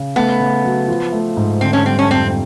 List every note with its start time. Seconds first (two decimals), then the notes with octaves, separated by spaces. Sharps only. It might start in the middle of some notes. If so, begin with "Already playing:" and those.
Already playing: C#3
0.16 A3 B3
0.40 C#3
0.65 F#3
0.88 F3
1.12 A3
1.37 G#2
1.61 D3 C4
1.73 C#4
1.85 G3 C4
1.99 C#4
2.09 F2 C4